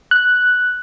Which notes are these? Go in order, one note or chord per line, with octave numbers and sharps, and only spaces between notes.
F#6